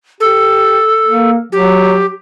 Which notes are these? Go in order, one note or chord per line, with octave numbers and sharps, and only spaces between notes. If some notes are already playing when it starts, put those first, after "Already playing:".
G4 A4
A#3
F#3 G4